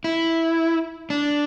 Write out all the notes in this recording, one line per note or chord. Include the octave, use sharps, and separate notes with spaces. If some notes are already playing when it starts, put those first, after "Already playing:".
E4
D4